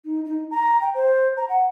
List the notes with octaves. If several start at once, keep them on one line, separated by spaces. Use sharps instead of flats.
D#4
D#4
A#5
G5
C5
A#5
F#5